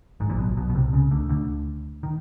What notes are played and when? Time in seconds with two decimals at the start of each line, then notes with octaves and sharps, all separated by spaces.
0.20 G#1 G#2
0.30 A#1 A#2
0.39 B1 B2
0.57 B1 B2
0.70 B2
0.75 C2 C3
0.93 C#2 C#3
1.11 D2 D3
1.29 D2 D3
2.03 D#3